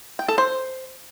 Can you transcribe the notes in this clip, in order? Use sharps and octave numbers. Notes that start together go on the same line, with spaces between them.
G5
A4
C5